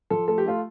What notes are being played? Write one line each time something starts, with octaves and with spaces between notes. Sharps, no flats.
F3 A4
A3 A4
G4
A3 F4